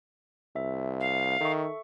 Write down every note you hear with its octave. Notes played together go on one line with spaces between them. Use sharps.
C2 E5
F5
D#3 A4 E5 C#6